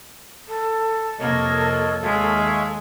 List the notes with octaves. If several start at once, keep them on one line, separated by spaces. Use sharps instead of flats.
A4
F2 C3 A#3 A#4 C#5 D#5
D#2 G#3 C#5 E5 F5